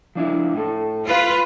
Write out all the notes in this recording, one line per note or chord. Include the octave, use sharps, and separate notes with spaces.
F3 D4 E4
A2 A4
F4 B4